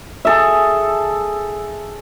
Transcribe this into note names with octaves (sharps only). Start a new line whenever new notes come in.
G#4 A4 E5